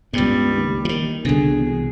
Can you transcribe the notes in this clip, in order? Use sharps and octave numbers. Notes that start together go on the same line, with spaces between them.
C#2 G2 G3 B3
D#2
D#3 E3
C2 B2 D3 G#4
E2